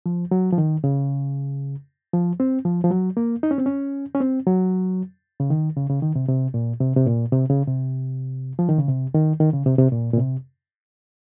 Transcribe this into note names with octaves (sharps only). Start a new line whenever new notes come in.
F3
F#3
F3
D#3
C#3
F3
C4
F3
F3
F#3
A#3
D#4
C#4
C4
C#4
C#4
C4
F#3
C#3
D#3
C#3
C#3
D#3
C3
C3
A#2
C3
C3
A#2
C3
C#3
C3
F3
D#3
C#3
C3
D#3
D#3
C#3
C3
C3
A#2
A#2
C3